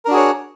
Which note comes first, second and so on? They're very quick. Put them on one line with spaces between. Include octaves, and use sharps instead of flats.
A#4 D4 F#4 G#4 C#5